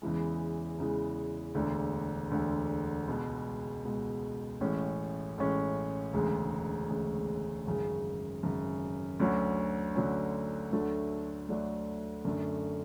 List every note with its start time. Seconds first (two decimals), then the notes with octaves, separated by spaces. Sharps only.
0.02 E2 C#3 E3 G#3
0.78 E2 C#3 E3 G#3
1.55 E1 D2 D3
2.31 E1 D2 D3
3.08 C#2 B2 G#3
3.85 C#2 B2 G#3
4.61 A1 A2 G#3 C#4
5.38 A1 A2 G#3 C#4
6.13 E1 D2 C#3 G#3
6.90 E1 D2 C#3 G#3
7.67 G#1 F#2 C#3
8.43 G#1 F#2 C#3
9.20 D2 D3 F#3 C#4
9.95 D2 D3 F#3 C#4
10.72 D2 D3 F#3 A3 D4
11.49 D2 D3 F#3 A3 D4
12.25 F#2 D3 A3